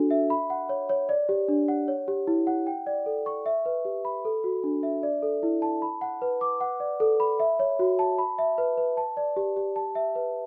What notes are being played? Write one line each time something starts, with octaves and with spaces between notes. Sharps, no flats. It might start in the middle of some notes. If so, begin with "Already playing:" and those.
Already playing: D4 F#4 A4
E5
B5
F#5
C#5
C#5
D5
G4
D4
F#5
C#5
G4
E4
F#5
G5
D5
A4
C#6
E5
B4
G4
B5
A4
F#4
D4
E5
D5
A4
E4
A5
B5
F#5
B4
D6
F#5
D5
A4
B5
E5
C#5
F#4
A5
B5
E5
B4
B4
A5
D5
G4
G4
A5
E5
B4